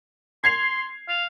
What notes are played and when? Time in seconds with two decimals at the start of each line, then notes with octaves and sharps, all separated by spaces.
0.44 C6 G#6 C7 F7
1.09 F5